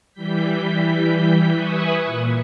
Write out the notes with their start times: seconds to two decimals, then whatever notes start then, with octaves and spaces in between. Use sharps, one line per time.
0.12 E3 G3 G6 B6
1.54 B4 E5 G#5 C#6 D#6 F#6
2.04 A#2